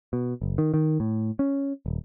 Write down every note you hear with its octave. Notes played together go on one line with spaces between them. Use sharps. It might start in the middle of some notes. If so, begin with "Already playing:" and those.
B2
F#1
D#3
D#3
A2
C#4
D#1